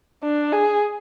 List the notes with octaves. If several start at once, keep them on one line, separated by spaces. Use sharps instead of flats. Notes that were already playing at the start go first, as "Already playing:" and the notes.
D4
G#4